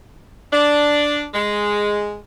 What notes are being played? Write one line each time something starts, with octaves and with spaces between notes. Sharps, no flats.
D4
G#3